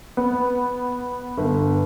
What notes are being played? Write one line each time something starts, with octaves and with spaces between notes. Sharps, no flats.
B3
G1